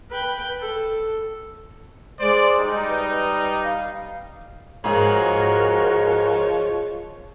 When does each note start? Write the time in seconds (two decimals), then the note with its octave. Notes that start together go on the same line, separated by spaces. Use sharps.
0.10 B4 G5
0.59 A4
2.20 G#3 C5 D5
2.58 G3 D#4
2.88 B4
3.63 F5
4.84 G#2 F3 G#3 F#4 G#4 A#4 C#5 F#6